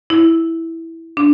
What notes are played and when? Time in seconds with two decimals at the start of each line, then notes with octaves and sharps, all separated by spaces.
0.10 E4
1.17 D4